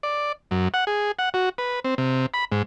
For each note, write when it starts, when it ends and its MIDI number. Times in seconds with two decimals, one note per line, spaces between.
0.03 0.32 74
0.51 0.68 42
0.74 0.85 78
0.87 1.12 68
1.19 1.29 78
1.34 1.49 66
1.58 1.80 71
1.85 1.95 60
1.98 2.26 48
2.34 2.45 83
2.52 2.62 44